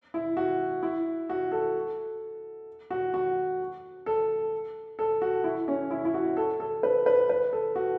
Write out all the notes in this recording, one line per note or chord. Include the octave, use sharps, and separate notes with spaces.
E4
F#4
E4
F#4
A4
F#4
F#4
A4
A4
F#4
E4
C#4
E4
E4
F#4
A4
A4
B4
B4
B4
A4
F#4